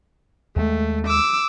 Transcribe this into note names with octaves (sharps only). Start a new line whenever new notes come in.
D#2 G#3 A3
D6 E6